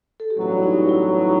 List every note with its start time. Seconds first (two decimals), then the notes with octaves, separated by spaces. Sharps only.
0.20 A4
0.30 G4
0.36 A1 G2 F#3 B3 F#4
0.52 E4
0.63 D#4
0.89 E4